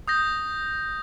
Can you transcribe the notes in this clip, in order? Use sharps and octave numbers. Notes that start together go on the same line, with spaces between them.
D#6 G6 A#6